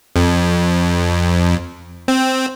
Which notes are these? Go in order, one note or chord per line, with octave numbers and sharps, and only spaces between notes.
F2
C4